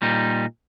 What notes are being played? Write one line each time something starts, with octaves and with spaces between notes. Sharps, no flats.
A#2 G3 D#4